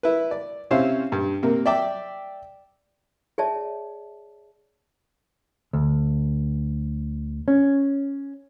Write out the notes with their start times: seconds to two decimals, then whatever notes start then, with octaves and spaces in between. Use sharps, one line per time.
0.03 E4 B4
0.31 D5
0.71 C3 C#4 E4 C5 F5
1.12 G2
1.43 C3 A#3
1.66 D5 E5 G5 D6
3.38 G#4 C#5 D5 E5 A5
5.73 D2
7.48 C#4